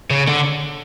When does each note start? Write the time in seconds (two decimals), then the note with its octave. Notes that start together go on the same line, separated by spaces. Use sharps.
0.11 C#3
0.28 D3